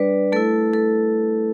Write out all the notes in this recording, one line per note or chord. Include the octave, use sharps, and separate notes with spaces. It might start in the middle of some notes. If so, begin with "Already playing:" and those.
Already playing: G3 D4 B4 D5
A3 E4 A4
A4